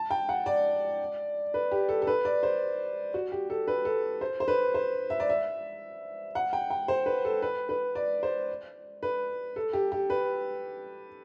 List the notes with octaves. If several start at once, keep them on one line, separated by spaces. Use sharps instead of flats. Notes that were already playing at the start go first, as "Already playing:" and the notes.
Already playing: A5
G5
F#5
D5
B4
G4
A4
A4
B4
D5
C5
F#4
G4
A4
B4
A4
C5
C5
B4
C5
E5
D5
E5
F#5
G5
G5
C5
B4
A4
B4
B4
D5
C5
B4
A4
G4
G4
B4